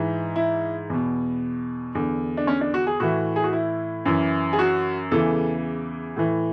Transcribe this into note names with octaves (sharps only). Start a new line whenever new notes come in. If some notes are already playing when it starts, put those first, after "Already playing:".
Already playing: G#2 E3
E4
E2 B2
E2 D3
D4
C#4
D4
F#4
G#4
A2 E3 F#4
G#4
F#4
E4
F#2 E3
G#4
F#4
E2 C#3 E3 A4
A2 E3